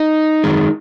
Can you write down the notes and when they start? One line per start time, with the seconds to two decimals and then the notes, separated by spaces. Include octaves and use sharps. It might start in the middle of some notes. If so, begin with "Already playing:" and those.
Already playing: D#4
0.44 F#2 D#3 G#3